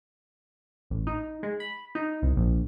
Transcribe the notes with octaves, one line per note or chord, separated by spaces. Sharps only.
A1
D#4
G#3
B5
D#4
C2
A#1